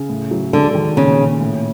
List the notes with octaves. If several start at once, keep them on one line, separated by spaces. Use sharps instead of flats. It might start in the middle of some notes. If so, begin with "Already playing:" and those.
Already playing: C#3
A2
F#3
D3 G#3
D#3
A#2 C#3
A#2
A2